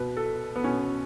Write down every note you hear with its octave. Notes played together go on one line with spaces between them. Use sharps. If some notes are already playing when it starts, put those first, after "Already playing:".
Already playing: B2 B4
A4
B3
B2 C#4